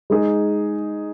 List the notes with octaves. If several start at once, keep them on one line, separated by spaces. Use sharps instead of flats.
G#3 D#4 G#4